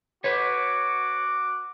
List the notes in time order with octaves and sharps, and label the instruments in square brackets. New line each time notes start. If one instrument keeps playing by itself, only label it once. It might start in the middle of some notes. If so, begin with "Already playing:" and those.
[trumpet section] F#4 D6 [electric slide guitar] B4 C#5